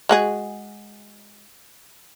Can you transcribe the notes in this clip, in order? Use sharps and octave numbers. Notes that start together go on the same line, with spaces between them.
G#3 F#4 G#4